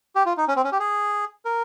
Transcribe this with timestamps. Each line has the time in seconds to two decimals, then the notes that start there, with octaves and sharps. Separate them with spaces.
0.16 G4
0.26 F4
0.37 D#4
0.48 C#4
0.56 C4
0.64 C#4
0.72 G4
0.79 G#4
1.45 A#4